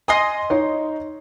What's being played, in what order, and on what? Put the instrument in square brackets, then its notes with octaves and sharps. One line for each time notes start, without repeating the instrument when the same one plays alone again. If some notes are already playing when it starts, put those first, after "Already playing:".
[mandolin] D#5 C6 D#6 [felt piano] G#5 C7
[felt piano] D#4 C#5